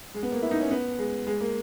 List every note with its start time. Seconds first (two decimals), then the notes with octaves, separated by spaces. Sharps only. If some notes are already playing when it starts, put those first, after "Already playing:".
0.14 G#3
0.23 B3
0.32 A#3
0.42 E4
0.51 D#4
0.61 C#4
0.71 B3
0.99 G#3
1.27 G#3
1.41 A#3